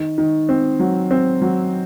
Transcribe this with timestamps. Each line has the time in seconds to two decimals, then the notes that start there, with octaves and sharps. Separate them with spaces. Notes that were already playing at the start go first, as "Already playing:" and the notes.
Already playing: D#3
0.18 D#3
0.49 C4
0.80 F#3
1.11 C4
1.42 F#3